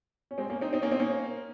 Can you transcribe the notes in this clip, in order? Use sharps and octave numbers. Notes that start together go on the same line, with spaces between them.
C#4
G#3 C4
A#3 C#4
C4 D#4
C4 D#4
A#3 C#4
C4 D#4
A#3 C#4